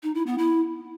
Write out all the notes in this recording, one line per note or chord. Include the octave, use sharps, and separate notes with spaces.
D#4
E4
B3
E4